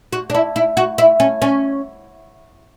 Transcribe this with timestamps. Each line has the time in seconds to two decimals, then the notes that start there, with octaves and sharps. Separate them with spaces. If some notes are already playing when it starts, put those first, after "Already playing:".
0.13 F#4
0.30 D4
0.35 E4
0.56 E4
0.77 F#4
0.98 E4
1.20 C#4
1.42 C#4